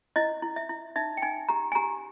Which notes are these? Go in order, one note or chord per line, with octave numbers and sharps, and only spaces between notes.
E4 D#5
E4
E5
E4
D#4 E5
G5
D#4 G#5
G4 A#5
G#5
G4 A#5